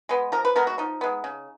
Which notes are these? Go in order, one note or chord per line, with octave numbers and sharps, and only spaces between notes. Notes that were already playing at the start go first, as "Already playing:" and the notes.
G#3 B3
F3 A#4
B4
G#3 B3 A#4
F#4
F3 D#4
G#3 B3
C#3